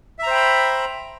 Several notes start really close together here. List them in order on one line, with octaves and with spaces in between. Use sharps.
E5 A#5 C5 G5 B5